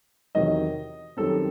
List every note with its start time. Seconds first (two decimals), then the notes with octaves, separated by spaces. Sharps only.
0.35 E2 C3 D#3 F#3 D#5
1.17 F#2 D#3 G3 C4 A4